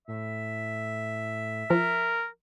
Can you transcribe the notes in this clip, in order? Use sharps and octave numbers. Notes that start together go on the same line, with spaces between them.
A2 E5
F3 A#4